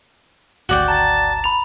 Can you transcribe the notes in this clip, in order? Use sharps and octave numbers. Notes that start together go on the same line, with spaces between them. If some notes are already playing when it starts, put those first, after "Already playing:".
G#1 D2 F#4 D5 G5
A5 A#5
B5 F7